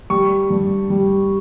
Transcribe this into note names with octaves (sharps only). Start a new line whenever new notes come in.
G3 C#6
G2
G3